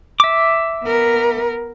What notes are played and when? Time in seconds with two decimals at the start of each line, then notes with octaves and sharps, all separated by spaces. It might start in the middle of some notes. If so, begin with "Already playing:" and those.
0.20 E5 D6
0.85 B3 A#4